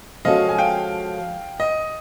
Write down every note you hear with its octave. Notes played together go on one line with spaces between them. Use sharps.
F3 G#3 C#4 F#4 A4 D#5 F5
G#5
F5 G5
D#5